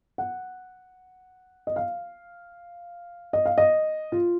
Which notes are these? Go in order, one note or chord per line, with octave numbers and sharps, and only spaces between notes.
F#5
D#5
F5
D#5
F5
D#5
F4